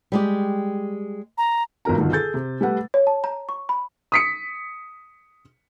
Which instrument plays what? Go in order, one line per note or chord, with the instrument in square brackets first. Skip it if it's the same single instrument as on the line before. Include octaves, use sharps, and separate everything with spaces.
[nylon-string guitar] G3 G#3 G4
[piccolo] A#5
[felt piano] G#1 C#2 B2 A#4 A#5
G2 B2 D3 D#3 F3
G#4 A4 G6 A6
C3
G3 A3 B4 F#5
[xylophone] C#5
A5
A#5
C#6
B5
[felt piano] D#6 B6 C#7